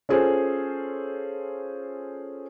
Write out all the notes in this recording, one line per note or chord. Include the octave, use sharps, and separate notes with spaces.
C#4 F4 G#4 A4 C5